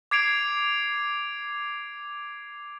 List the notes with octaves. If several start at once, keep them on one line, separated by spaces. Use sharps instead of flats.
D6 G#6 C7 D7 F7